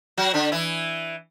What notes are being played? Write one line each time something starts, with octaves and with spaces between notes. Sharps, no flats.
F#3 F#4
D3 D4
E3 E4